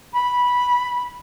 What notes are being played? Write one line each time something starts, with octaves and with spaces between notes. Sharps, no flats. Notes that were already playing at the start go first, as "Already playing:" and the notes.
B5